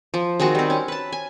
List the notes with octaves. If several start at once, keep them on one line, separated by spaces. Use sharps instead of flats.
F3
D#3 G#3 C4 F#4
G3 C4
C#4
B4 A5
G#5